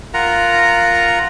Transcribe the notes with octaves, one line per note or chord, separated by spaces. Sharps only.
F4 A#4 F#5 A#5